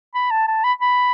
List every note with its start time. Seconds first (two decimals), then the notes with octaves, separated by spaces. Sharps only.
0.15 B5
0.31 A5
0.48 A5
0.64 B5
0.81 B5